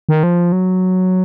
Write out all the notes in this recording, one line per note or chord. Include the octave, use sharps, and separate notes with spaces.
D#3
F3
F#3